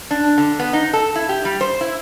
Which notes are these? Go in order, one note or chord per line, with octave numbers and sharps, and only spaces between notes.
D4
D3
B3
D#4
A4
E4
G4
G3
C5
E4